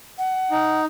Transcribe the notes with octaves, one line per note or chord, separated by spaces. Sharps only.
F#5
D#4